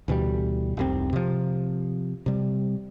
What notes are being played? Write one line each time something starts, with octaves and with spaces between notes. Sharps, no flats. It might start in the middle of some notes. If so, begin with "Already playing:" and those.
D2 B2 E3 G3
F1 C2 C4
C3 F3
C3 G3